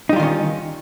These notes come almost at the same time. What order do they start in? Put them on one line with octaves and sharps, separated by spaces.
D#4 G3 F4 D#3 C#4